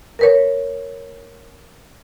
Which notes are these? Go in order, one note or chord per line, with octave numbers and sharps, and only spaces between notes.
A#4 B4 C#5